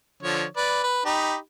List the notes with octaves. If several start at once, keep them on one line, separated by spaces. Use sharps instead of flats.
D3 F3 C#5
B4 D5
B4
D#4 G4 B5